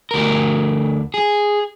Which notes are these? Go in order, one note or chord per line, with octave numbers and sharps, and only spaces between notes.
D2 A#4
G#4